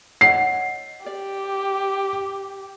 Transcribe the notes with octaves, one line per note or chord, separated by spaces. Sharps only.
C#5 D#5 F#5 C7
G4 D5